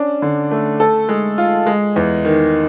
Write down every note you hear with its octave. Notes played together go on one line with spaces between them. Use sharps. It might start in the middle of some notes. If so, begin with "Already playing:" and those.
Already playing: C#4 D4
D3
A3
A4
G#3
F4
G#3
E2
D#3